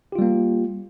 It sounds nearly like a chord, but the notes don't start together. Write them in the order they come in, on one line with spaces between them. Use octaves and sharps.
G4 F4 G3 A#3